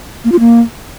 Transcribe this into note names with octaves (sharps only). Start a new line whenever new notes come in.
A#3
F4
A#3